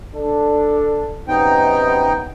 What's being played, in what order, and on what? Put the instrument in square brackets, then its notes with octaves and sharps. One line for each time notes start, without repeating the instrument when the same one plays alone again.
[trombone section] D4 A4
[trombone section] F#2 C3 B3 [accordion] D#4 G5